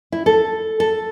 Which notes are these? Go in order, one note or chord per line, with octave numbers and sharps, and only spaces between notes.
E4
A4
A4